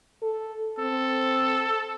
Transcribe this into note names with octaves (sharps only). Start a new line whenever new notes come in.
A4
C4 A4